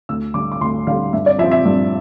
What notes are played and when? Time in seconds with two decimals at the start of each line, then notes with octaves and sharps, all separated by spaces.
0.09 D2 E6
0.34 D3 G3 D6
0.52 D6
0.61 D2 C6
0.87 D3 G3 F5
1.13 G2 E5
1.26 D5
1.38 F3 E5
1.43 C4
1.51 E5
1.65 G2